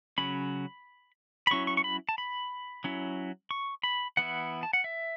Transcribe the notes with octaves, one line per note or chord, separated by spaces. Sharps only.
C#3 F#3 C#4 B5
B5
F#3 C#4 E4 C#6
C#6
C#6
B5
A5
B5
F#3 C#4 E4
C#6
B5
E3 B3 E4 F#5
A5
F#5
E5